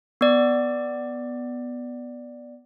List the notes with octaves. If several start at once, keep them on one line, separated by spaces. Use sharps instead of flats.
B3 D5